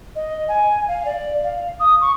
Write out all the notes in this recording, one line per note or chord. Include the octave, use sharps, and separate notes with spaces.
D#5
G#5
F5
D5
F5
D#6
C#6